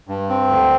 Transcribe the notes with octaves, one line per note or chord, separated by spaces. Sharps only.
G2
C4
D2